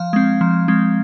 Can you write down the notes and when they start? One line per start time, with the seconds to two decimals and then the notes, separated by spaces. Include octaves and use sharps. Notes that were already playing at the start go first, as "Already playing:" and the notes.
Already playing: F3 F5
0.13 G#3 C4
0.41 F3
0.68 G#3 C4